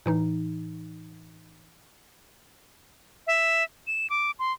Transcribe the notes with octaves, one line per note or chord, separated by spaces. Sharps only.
A2 E3 D#4
E5
E7
D6
C6